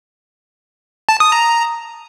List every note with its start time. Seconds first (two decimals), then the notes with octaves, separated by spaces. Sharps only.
1.09 A5
1.20 D#6
1.32 A#5